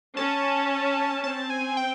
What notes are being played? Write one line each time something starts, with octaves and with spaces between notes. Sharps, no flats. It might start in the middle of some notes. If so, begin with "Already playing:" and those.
C#4 A5
C4 A5
G#5
G5